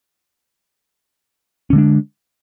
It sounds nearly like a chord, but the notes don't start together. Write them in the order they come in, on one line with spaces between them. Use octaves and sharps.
C#4 D3 G#3 D4